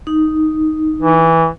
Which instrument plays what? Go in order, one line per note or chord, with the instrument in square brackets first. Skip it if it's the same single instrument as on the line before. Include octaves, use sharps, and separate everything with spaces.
[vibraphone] D#4
[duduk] E3